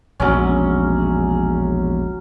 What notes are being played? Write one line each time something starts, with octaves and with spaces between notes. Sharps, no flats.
E1 A#1 F#3 C#4